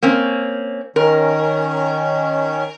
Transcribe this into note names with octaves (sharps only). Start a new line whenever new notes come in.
A#3 C4 C#4
D#3 C#4 A#4